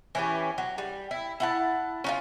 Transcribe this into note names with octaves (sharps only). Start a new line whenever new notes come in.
E3 C#4 G4
F#3
G3
E4
E4 F#5 A5
C#4 D#4 F4